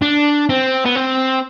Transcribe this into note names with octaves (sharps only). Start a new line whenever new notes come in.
D4
C4
B3
C4